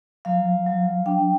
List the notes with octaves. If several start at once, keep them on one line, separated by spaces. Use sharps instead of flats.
F#3 F5
F#3
F#3
F#3
D4 G5